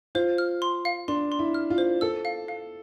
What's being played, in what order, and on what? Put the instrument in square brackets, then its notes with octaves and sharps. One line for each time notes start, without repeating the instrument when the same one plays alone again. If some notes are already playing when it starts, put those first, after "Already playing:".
[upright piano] F4 [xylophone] C5
[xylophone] F6
C6
F5
[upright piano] D4 [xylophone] C6
[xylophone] C6
[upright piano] E4
[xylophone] F6
[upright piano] F4
[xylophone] C5
[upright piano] A4 [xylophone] E6
[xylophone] F5
F5